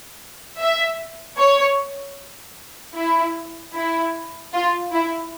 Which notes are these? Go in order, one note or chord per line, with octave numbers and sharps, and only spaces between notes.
E5
C#5
E4
E4
F4
E4